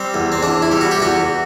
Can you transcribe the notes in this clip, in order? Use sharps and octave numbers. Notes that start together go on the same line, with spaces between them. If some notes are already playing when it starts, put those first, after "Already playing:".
Already playing: G3 C4
E2
C4
E2 D4
E4
G3
F#4
G4
E2 F#4